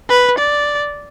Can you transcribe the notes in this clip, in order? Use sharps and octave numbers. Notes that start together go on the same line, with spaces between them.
B4
D5